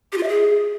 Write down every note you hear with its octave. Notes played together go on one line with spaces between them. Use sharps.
G4
F4
E5
G#4